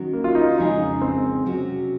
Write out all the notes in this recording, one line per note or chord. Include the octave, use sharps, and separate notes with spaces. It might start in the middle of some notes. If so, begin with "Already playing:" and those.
Already playing: D#3 F#3 C#4 F#4
A#3
F4
D#4
F4
F2 C#3 G#3 C#4 D#4 G#4
C4
C3 F#3 C#4 F#4